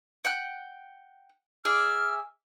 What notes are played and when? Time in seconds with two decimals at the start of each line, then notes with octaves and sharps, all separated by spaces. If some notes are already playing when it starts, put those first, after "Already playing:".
0.25 F#5 G5 F#6
1.65 G#4 D5 E5 F6